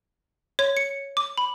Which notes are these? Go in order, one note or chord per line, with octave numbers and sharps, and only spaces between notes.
C#5
C#7
D6
B5